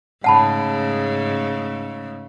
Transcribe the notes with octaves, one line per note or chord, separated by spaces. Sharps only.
G#2 C#3 A3 F#5 A5 B5